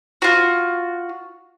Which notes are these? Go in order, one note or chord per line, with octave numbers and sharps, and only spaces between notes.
F4 F#4